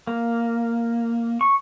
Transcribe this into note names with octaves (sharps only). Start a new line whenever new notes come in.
A#3
C#6